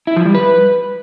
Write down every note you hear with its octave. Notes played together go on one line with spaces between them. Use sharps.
E4
F3
G3
B4